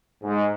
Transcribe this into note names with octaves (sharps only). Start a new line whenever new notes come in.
G#2